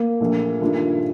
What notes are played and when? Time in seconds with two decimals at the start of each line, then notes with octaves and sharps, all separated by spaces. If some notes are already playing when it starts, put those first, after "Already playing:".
Already playing: A#3
0.20 A#1 A#2 A3
0.61 G2 D#3 A3 D4 F4